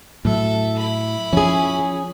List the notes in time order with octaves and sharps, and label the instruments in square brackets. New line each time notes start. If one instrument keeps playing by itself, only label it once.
[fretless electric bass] A2 F#3 [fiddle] A4 E5
[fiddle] E4 B5
[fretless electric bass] F3 [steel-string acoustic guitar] C#4 G#4